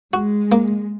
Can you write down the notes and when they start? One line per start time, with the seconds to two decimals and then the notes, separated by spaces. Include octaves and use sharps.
0.13 G#3 F#4
0.52 A#3